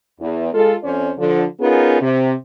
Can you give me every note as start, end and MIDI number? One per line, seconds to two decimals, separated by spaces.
0.20 0.49 40
0.53 0.76 56
0.53 0.76 65
0.53 0.76 69
0.84 1.12 41
0.84 1.12 61
0.84 1.12 72
0.84 1.12 74
1.18 1.45 50
1.18 1.45 53
1.60 2.00 59
1.60 2.00 61
1.60 2.00 63
1.60 2.00 65
1.60 2.00 68
1.60 2.00 70
2.01 2.33 48